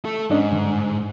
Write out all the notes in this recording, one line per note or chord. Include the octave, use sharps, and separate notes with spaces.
A3 A4
G#2 C#4 D4 D#5
G2 D3